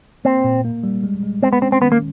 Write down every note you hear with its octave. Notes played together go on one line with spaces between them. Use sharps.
A#3 C4
A#2
A#3
G3
G#3
G#3
G#3 C4
B3
C4 C#4
C4
D#3 B3
A#3